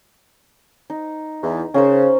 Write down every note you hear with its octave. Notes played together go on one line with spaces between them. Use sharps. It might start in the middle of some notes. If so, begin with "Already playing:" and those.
D#4
E2
C#3 C#4 A#4 C5